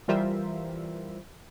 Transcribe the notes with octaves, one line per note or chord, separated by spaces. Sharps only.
E3 G3 F4 A#4 C5 E5